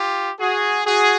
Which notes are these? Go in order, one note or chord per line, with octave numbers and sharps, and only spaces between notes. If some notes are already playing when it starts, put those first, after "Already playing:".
Already playing: F4 G4
F#4 G#4
F#4 G#4